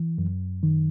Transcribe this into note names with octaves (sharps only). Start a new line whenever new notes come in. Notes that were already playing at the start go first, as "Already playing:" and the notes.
Already playing: E3
F#2
D#3